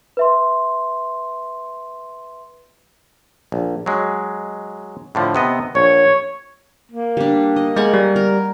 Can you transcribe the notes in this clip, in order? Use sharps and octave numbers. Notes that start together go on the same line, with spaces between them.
B4 E5 C6
A#1
F#3 G#3
A2 D3 F3
C3 B3 D#5
A#1 C#5
A#3
G3 D4
D#5
G#3 A#4 F#5 G#5
G3
A#4